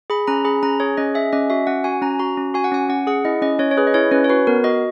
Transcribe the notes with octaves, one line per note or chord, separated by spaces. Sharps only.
G#4 B5
C#4 A#5
G#4 B5
C#4 A#5
G#4 C#5
C#4 D#5
G#4 E5
C#4 D#5
F#4 E5
C#4 F#5
F#4 G#5
C#4 A#5
F#4 A#5
C#4
F#4 G#5
F#5
C#4 G#5
C#4 F#5
G#4 F#5
E4 D#5
C#4 D#5
C#4 C#5
C#5
G#4 B4
D#5
E4 C#5
C#4 B4
C#5
F#4 B4
B3 A#4
F#4 D#5